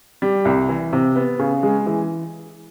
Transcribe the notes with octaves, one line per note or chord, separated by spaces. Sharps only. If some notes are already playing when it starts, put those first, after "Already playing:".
G3
C2
E3
C3
B3
C#3
G#3
E3